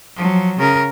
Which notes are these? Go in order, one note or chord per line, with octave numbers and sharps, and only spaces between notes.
F3 F#3
C#3 A#4